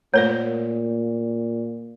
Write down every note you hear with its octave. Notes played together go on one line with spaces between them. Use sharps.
A#2 A3 A#4 C5 C#5